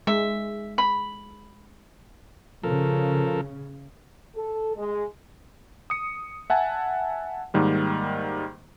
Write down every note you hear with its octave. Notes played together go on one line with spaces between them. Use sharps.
G#3 E5
B5
C#3 F3 A4 A#4
A4
G#3
D#6 C#7
E5 F#5 G#5 A5
G#2 D#3 G3 A#3